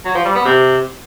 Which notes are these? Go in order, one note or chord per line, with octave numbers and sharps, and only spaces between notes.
F#3
F3
G3
B3
C3